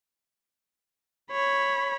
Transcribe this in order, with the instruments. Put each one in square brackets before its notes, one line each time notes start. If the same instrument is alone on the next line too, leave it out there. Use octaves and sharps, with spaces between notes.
[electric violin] C#5 B5